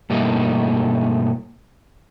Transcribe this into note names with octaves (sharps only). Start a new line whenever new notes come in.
G2 B2 G3 A3 A#3 D#4